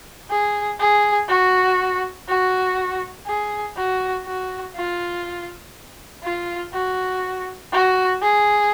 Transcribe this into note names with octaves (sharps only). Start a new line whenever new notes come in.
G#4
G#4
F#4
F#4
G#4
F#4
F#4
F4
F4
F#4
F#4
G#4